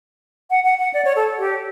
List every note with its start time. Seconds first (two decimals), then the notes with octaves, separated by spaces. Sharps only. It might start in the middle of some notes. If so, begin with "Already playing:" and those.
0.51 F#5
0.64 F#5
0.79 F#5
0.94 D5
1.05 C#5
1.16 A4
1.39 G4